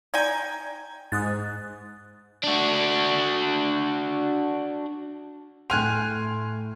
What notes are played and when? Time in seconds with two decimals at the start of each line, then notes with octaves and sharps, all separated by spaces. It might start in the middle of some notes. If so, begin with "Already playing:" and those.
0.14 D#4 D5 G5 G#5 A#5 G#6
1.12 G#2 D#6 F#6 A6
2.44 D4 F#4
5.70 A2 G5 G#5 C6 F6 F#6 G#6 F7